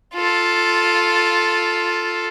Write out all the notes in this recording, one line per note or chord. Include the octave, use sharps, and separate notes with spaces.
F4 A4